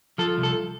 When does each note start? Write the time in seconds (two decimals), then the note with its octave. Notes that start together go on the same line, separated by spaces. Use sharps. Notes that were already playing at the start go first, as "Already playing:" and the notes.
0.18 F3 A4
0.38 C2
0.43 A4